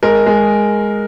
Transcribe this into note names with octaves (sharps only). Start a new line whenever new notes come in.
G#3 A#4
G#3